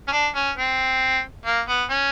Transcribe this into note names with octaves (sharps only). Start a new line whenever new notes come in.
C#4
D4
C#4
C4
A#3
B3
C#4